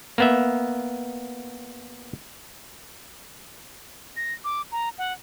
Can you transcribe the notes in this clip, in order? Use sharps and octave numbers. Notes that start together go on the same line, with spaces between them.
A#3 B3 E5
A#6
D6
A#5
F#5